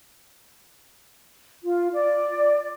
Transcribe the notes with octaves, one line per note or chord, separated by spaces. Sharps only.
F4
D5